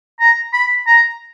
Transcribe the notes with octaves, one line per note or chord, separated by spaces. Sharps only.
A#5
B5
A#5